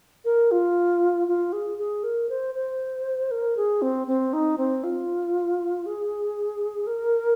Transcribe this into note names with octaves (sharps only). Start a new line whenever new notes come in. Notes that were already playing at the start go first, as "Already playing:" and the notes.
A#4
F4
F4
G#4
G#4
A#4
C5
C5
A#4
G#4
C4
C4
D#4
C4
F4
G#4
A#4